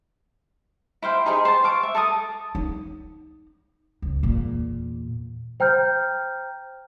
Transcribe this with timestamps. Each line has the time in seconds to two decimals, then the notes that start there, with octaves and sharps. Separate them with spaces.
1.02 E4 C5 F5 G5
1.26 D#4 G4 G#4 C5
1.45 C5 A5
1.64 F5 C#6 D6
1.83 E5
1.95 A4 A5 A#5 D#6
2.55 D#4
4.02 C#2
4.23 E2 A#2
5.60 C5 G5 A#5 F6 G6